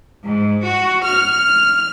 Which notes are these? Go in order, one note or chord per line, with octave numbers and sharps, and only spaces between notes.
G#2
F#4
F6